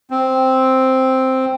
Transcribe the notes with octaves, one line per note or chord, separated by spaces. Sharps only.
C4